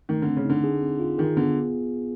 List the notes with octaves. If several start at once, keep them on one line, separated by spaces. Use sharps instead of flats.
D#3 A3
D3
C4
C#3
D3 D#4
G#4
C4
F4
D#3 G#4
D3 B3